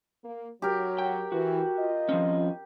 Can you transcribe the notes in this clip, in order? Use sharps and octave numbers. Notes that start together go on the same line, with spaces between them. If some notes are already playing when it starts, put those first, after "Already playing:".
A#3
F#3 G4 A#4
G5
E3 F#4
F4 D#5
F3 C4 C#4